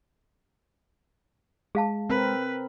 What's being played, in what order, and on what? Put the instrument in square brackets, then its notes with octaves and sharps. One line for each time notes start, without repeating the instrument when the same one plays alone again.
[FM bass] G#3 [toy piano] G#4 F5 A5
[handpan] C4 A#4 [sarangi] B4